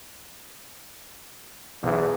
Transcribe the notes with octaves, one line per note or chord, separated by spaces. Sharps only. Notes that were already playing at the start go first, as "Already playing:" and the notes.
B1 E2 E3